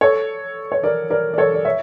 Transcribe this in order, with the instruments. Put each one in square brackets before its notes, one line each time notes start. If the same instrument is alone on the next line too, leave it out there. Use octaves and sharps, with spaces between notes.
[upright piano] A4 C#5
C#5
A#4 D5
A#4 D5
D5
A4 C#5
D5
C#5 E5